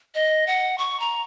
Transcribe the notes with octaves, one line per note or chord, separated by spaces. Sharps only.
D#5
F#5
C#6
A#5